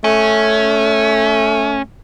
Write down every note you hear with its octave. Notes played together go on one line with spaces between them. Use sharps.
A3 C#4